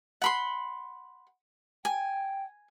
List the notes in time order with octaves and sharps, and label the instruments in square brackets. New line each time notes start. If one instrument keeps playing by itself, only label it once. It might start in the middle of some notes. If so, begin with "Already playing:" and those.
[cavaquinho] F#5 B5 C6
[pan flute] G5 [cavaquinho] G#5